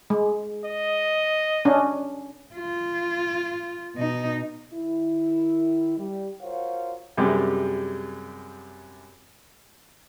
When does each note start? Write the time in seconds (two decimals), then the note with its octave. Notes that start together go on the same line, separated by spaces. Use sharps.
0.10 G#3
0.65 D#5
1.65 C#4 D4
2.56 F4
3.96 B2 D#4
4.73 D#3 E4
5.98 G3
6.41 F4 F#4 A#4 C5 C#5 F5
7.17 F#2 C3 G3 G#3